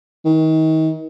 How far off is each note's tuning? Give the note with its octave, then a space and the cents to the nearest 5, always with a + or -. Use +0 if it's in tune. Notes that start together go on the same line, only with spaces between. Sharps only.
D#3 +35